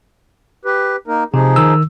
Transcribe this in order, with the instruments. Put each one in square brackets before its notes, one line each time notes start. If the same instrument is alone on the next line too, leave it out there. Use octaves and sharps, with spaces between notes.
[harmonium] G4 B4
A#3 D#4 A#4
[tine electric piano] C3 [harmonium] F3 D#4 G#4
[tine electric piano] D#3 E6